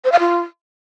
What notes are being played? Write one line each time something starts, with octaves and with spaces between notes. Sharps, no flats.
C5
F5
F4